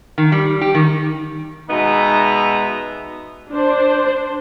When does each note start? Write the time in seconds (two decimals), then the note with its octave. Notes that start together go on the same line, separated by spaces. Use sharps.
0.18 D#3
0.32 G3
0.61 G4
0.75 D#3
1.70 B2 G#3 B3 D#4 E5 A#5
3.52 D4 C5